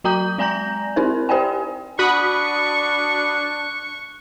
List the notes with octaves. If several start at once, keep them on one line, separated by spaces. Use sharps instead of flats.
F#3 F#4 G5 A#5 D#6 G6
G#3 D5 G#5 A#5 G6 A#6
C4 D#4 E4 A#4 C5
G4 C5 D5 G5 G#5
D4 F#4 B5 C#6 D#6 F#6